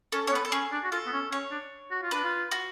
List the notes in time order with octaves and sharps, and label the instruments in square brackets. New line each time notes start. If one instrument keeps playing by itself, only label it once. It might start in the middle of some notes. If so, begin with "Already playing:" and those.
[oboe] C#4 [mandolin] A4
[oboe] C#4 [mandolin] C#5
[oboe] B3
[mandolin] B4
A4
[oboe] C#4 [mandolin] G#4
[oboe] D4
F#4
[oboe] F4 [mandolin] A4
[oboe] B3
C#4
[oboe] C#4 [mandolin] C#5
[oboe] D4
F#4
F4
[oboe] D4 [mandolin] B4
[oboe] F4
[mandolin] F#4